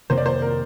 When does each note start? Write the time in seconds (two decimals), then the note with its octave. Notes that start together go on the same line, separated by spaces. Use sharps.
0.10 F2 C3 D#3 A#3 C5
0.18 D5
0.26 C5
0.42 A#4